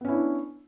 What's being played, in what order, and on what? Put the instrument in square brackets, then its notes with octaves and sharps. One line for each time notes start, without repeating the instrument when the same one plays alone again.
[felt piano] B3
C#4
E4
D4